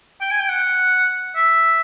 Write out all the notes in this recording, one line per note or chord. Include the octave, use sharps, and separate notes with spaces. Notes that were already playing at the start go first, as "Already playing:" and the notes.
G5
G#5
G5
F#5
E5